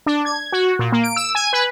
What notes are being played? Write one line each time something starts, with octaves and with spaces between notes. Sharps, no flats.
D4
G#6
F#4
A#2
A#3
D7
E6
G#5
B4